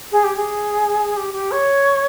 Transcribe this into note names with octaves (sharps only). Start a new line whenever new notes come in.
G#4
G4
G#4
G4
G4
C#5